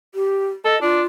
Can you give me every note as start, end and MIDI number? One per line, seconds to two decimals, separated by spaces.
0.15 0.46 67
0.65 0.76 69
0.65 0.79 75
0.82 1.01 62
0.82 1.06 65